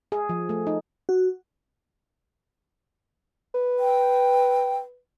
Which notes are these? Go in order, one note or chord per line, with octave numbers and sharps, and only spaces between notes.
G#4
F3
A3
D#4
F#4
B4
G5